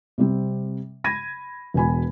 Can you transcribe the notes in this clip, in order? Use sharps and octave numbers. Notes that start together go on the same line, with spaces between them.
C3 G3 C4
B5 G#6 A#6 D#7
E1 B2 G#5 B5